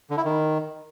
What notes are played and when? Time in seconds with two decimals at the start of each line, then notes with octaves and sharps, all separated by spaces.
0.10 D3
0.17 E4
0.25 D#3